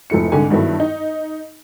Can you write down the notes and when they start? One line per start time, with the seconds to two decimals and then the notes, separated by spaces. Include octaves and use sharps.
0.10 F1 F3 A3 E4 C#7
0.32 C2 G#2 D3 G#5
0.50 G2 D#3 F#3 B3 E4 A4
0.80 D#4